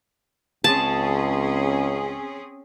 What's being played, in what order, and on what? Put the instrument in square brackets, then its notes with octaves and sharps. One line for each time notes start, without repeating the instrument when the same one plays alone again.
[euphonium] C#2 [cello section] C4 C#4 G#4 [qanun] A5